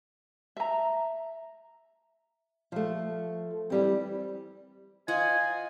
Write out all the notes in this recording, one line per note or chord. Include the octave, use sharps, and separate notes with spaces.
E5 A#5
F3 A3
E3 G3 C4
F4 C5 D#5 F#5 G#5